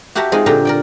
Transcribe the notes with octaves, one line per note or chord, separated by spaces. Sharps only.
F#4 G4 E5 F#5 A5 A#5
G#3 C4 D#4 F4
A#2 D3 G4 A#5
A#4 D5 G5